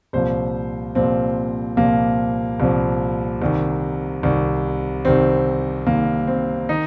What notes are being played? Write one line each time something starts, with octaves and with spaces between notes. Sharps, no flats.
C2 A#2 F3 C5
C2 A#2 F3 C4
C2 A#2 F3 A#3
C2 A#2 F3
C2 C3 D#3
C2 C3 D#3
C2 C3 D#3 C4
C2 C3 D#3 A#3
C4
D#3 D#4